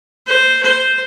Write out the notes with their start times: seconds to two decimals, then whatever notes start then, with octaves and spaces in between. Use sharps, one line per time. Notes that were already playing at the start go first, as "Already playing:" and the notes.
0.27 C5
0.62 C5